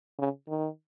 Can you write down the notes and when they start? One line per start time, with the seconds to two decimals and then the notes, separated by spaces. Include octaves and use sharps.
0.19 C#3
0.49 D#3